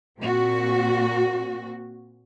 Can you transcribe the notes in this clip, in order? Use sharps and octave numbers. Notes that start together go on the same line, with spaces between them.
A#2 C4 F#4